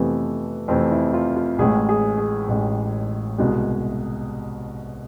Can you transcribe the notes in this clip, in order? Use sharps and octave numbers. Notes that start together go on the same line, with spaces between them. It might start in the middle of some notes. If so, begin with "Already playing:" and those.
Already playing: F2 C3 E3 A3 B3
F2 C3 E3 A3 C4
E4
F4
F4
A1 A2 G#3 G#4
G#4
G#4
A1 A2 G#3
C2 B2 G#3